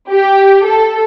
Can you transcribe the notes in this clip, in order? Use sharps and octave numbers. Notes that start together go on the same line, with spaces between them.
G4
A4